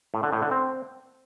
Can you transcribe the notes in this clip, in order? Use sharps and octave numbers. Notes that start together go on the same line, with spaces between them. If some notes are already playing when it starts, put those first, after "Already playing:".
A2
D3
A2
D3
C4